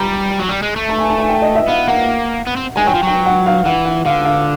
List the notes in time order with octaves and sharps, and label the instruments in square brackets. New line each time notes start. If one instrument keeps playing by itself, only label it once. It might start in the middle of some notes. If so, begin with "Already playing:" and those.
Already playing: [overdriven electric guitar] G3 [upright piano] A#5
[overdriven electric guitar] F#3
G3
G#3
A3
[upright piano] A5
G#5
A5
G#5
G5
D#5
E5
[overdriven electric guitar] B3 [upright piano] F5
[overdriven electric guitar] A#3 [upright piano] F#5
[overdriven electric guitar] B3
C4
[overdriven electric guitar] G#3 [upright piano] G#5
[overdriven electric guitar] F#3 [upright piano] G5
[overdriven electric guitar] F3
[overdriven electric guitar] F#3 [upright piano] G5
[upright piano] F#5
F5
[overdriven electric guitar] E3 [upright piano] F#5
[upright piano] F#5
[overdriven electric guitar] D3 [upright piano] F5
[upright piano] F5